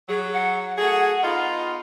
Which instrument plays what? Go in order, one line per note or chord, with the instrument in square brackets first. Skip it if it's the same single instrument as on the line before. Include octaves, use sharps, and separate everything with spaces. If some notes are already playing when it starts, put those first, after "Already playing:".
[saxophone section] F#3 [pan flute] G#4
[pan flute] F#5
[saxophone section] A3 F#4 G#4
B3 D#4 F4